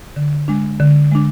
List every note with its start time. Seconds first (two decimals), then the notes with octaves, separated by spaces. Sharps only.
0.16 D3
0.48 G#3 D4
0.80 D3
1.12 G#3 D4